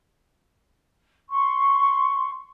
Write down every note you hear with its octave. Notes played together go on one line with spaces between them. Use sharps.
C6 C#6